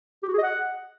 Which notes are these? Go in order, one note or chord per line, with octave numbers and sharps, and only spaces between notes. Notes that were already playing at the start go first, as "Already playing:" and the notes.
G4
F#4
G#4
D#5
F#5